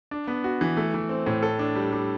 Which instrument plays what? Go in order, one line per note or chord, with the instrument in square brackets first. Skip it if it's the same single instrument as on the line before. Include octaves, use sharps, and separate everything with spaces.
[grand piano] D4
B3
F#4
E3
A3
E3
C4
A2
A4
D4
G3
G3